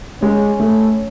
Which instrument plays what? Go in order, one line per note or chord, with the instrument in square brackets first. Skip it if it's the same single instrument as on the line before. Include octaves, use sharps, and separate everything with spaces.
[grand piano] G#3 [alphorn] C#4
[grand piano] A3